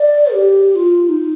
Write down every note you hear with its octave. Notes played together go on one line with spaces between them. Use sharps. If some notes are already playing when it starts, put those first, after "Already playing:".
Already playing: D5
G4
G4
F4
D#4